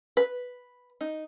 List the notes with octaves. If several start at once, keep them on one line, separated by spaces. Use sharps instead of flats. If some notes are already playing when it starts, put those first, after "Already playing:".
B4
D#4